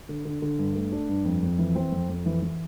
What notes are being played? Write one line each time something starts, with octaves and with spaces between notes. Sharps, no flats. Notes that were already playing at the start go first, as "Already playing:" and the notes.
D3
D3
D3
G2
A3
D4
G2
F2
F2
E3
C4
F2
F2
E3
E3